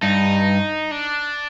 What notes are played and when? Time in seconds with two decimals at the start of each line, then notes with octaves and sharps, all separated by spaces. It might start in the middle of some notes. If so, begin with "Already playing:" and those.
0.02 G2 D#4
0.91 D4